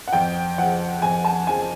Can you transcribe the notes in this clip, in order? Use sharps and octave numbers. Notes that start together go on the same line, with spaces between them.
F#5
F2 G5
C#3 F3 F#5
F2 G#5
A5
C#3 F3 G#5